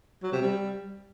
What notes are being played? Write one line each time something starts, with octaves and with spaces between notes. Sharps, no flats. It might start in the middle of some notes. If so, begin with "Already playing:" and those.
F#3
C3
G3